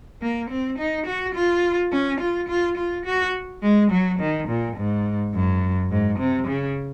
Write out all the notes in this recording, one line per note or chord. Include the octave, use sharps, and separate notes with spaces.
A#3
C4
D#4
F#4
F4
C#4
F4
F4
F4
F#4
G#3
F#3
D#3
A#2
G#2
F#2
G#2
C3
C#3